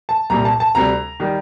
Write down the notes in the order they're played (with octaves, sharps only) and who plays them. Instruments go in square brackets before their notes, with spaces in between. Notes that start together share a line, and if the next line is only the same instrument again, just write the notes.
[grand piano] A5
C2 A#2 G3 A#5
A5
A5
D2 C3 G3 A#5
D#3 G3